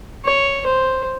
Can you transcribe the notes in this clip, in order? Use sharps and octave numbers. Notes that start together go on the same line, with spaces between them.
C#5
C5